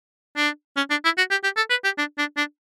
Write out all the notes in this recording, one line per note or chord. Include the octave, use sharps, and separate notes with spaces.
D4
C#4
D4
E4
F#4
G4
G4
A4
B4
G4
D4
D4
D4